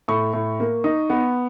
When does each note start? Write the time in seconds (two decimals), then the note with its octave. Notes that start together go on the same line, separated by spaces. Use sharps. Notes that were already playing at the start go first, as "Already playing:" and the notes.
0.08 A2 C#6
0.33 A2
0.60 A#3
0.84 D#4
1.10 B3